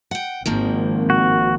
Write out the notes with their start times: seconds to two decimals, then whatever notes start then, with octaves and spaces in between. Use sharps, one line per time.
0.11 F#5 G5
0.46 G#1 D#3 F3 A#3
1.10 F#4